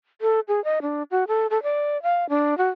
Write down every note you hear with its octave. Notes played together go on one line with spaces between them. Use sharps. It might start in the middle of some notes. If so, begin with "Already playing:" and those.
A4
G#4
D#5
D4
F#4
A4
A4
D5
F5
D4
F#4